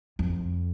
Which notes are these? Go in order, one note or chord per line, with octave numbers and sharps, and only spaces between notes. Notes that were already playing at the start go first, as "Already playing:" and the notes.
F2